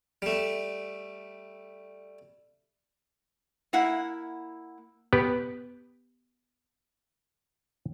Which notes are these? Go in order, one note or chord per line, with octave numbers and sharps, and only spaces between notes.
G3 A3
A#3 E4 F#5
B3 G4 B4